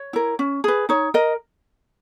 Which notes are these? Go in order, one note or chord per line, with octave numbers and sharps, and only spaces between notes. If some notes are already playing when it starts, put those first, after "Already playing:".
Already playing: C#5
E4 A#4
C#4
G#4 B4
D#4 C#5
A#4 D#5